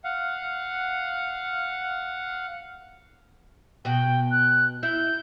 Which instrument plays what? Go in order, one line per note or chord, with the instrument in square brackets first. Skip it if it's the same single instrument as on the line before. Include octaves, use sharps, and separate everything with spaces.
[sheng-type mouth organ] F5 F#5
[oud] B2 F#4 [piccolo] G5
[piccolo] F#6
[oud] E4 [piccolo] G6